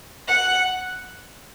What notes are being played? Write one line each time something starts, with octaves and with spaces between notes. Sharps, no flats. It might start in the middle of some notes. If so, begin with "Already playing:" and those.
F#5